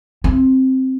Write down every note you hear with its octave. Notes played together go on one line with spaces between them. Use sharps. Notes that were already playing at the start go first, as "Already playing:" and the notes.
C4